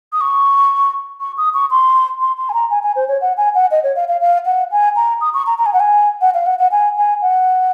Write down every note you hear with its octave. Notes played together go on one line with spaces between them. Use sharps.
D#6
C#6
C#6
D#6
C#6
C6
C6
C6
G#5
A#5
G#5
G#5
C5
C#5
F#5
G#5
F#5
D#5
C#5
F5
F5
F5
F#5
G#5
A#5
D#6
C#6
A#5
A#5
G#5
F#5
G#5
F#5
F5
F#5
F#5
G#5
G#5
F#5